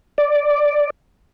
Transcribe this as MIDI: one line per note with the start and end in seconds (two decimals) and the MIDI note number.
0.18 0.90 74